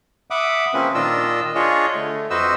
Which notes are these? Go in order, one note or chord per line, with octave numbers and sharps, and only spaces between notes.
E5 F#5 B5 D6 D#6
C#3 F3 A#3 C4 C#4 B4
A#2 D#3 D4 F4 D#5 E6
D4 F4 G#4 C#5 D#5
D3 A3
F2 F#4 B4 C5 D#5 E6